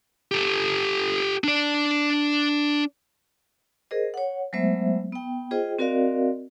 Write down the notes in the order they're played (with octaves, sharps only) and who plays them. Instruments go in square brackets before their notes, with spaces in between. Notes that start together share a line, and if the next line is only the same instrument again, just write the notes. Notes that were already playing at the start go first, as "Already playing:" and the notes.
[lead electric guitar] G4 A4
D4 D5
[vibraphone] G#4 A#4 C5 D#5
C#5 F#5
F#3 G#3 A3 B3 C5 E5
B3 G5
F4 G#4 C5 D#5 G5
C4 F#4 A#4 D5 D#5 F5